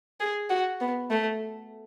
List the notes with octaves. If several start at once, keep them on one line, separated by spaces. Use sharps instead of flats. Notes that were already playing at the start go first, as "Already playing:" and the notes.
G#4
F#4
B3
A3